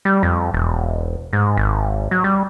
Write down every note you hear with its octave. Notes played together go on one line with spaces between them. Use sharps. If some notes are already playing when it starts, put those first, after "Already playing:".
G3
F2
E1
G#2
G#1
F#3
G3